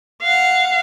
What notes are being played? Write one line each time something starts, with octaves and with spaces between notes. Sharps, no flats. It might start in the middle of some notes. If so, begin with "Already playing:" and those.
F5 F#5